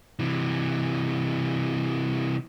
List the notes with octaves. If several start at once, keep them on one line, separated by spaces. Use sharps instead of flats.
C3 E3